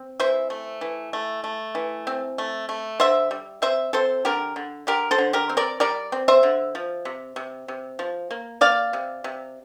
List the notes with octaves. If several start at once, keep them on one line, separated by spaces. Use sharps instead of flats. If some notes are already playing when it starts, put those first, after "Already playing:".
Already playing: C4
E3 C5 E5
A3
E3
A3
A3
E3
C4
A3
A3
D3 C5 E5
G3
C4 C5 E5
C4 A4 C5
D3 G4 A#4
D3
D3 G4 A#4
A4 C5
D3
G4 A#4
C4
A#4 D5
G3 A#4 D5
C4
C5 E5
D3
F3
C3
C3
C3
F3
A#3
A#3 D5 F5
C3
C3